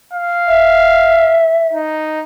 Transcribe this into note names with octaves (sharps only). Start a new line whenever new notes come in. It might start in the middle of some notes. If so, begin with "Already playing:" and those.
F5
E5
D#4